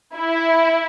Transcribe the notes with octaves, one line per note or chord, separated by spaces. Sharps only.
E4